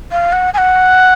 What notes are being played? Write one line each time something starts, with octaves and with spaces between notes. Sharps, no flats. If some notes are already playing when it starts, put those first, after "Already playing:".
F5
F#5
G#5
F#5